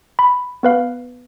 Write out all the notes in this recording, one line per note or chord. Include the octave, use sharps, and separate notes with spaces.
B5
B3 B4 F5